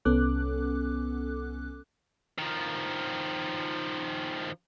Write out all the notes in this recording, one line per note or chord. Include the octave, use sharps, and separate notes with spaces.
C2 B3 C#4 A4 D6 F#6
D#3 F3